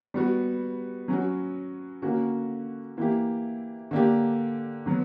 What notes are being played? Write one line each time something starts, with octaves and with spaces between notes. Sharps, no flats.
G3 B3 F#4
F#3 C#4 F#4
D3 A#3 C#4 F#4
E3 A#3 E4 G4
D3 A#3 D4 G4
D3 F#3 B3